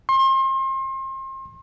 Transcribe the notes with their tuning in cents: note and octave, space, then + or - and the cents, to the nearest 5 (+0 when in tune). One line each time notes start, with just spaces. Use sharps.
C6 +35